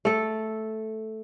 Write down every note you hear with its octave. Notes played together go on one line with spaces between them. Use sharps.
A3 A4